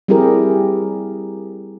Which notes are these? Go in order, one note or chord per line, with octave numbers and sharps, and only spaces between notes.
G3 C4 E4 G4 G#4 A#4